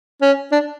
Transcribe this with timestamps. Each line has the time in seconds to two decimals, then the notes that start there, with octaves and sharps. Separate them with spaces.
0.22 C#4
0.52 D4